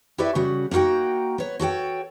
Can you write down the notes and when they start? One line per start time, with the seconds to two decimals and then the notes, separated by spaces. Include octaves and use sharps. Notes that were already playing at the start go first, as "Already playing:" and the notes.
0.18 E4 G4 B4 C#5 D5 E5
0.35 C#3 G3 F#4
0.71 A#3 D#4 F4 F#4 G5
1.38 B3 C#5
1.60 F#4 A4 C#5 G5